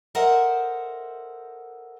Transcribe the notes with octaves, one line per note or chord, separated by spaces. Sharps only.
A4 A#4 C5 D#5 E5 F#5